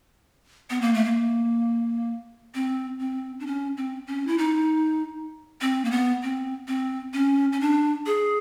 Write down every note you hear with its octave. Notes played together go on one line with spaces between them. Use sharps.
B3
A#3
A3
A#3
C4
C4
D4
C#4
C4
C#4
E4
D#4
C4
A#3
B3
C4
C4
C#4
C#4
D4
G#4